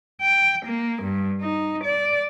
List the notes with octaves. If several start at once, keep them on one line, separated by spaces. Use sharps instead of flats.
G5
A#3
G2
D#4
D5